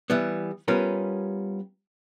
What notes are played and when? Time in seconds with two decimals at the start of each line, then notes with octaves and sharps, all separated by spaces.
0.10 E3 G3 B3
0.68 G3 B3 C#4 F4 A#4